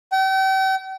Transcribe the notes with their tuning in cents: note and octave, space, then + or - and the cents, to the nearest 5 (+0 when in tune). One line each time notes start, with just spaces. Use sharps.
G5 -40